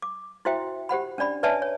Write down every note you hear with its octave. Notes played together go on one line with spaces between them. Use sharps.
D6
E4 F#4 C5 E5 G5
G4 C5 F#5 B5
C#4 D4 D5 B5
B4 C#5 D5 E5 G#5 A5
C#5